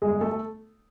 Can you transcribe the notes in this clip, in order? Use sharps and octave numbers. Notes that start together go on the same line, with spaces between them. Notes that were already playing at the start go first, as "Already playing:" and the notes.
G1 G#3 G#4
A3 A4
A4